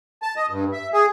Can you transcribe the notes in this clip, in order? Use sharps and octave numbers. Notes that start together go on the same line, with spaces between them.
A5
D#5
G2
E5
G#4